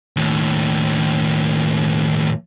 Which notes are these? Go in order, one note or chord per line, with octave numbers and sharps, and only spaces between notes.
D#2 A2